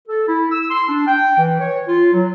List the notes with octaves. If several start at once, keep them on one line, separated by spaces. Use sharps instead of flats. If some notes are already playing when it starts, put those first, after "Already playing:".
A4
E4
E6
C6
D4
G5
E3
C#5
F4
F#3